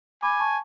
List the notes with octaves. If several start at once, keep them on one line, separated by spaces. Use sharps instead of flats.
G#5 B5 D6
A5 C#6